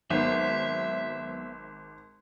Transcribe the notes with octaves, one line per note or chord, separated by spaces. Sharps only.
G#1 F#3 B3 E5